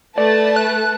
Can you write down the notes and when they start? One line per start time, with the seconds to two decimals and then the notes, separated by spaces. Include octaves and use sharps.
0.18 A3 B4 D5 A5
0.56 F#6